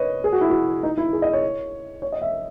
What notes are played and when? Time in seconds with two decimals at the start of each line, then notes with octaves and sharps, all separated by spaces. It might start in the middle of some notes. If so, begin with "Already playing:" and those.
Already playing: B4 C#5 D#5
0.24 G#4
0.33 F#4
0.41 E4
0.50 F#4
0.83 D#4
0.97 E4
1.13 G#4
1.22 D#5
1.33 C#5
2.02 C#5
2.12 D#5
2.22 E5